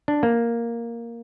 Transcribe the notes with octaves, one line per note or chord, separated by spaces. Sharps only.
D4
A#3